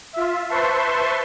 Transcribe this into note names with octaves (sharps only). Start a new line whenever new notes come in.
F4 E5
B4 C5 E5 A5 C6 C#6